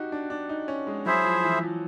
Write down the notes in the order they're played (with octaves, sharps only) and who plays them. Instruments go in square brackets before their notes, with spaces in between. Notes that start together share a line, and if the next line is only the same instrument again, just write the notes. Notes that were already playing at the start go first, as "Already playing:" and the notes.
Already playing: [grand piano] D#4 F#4 G4
D4
D4
D#4
C#4
G#3
[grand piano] F#3 [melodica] E4 G#4 C5 E5
[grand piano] F3
E3
F3